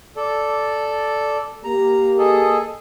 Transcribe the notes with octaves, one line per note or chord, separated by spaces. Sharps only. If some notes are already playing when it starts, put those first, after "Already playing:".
A4 D5
A#3 G4 A#5
G#4 A4 D#5